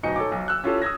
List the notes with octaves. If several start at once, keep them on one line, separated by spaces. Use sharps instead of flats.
D1 B2 D#4 D#5 C#7
A4 C#5 D6
B1
E6 F#6
C#4 E4 F4 G4 A4
D#6 E6 G#6 A#6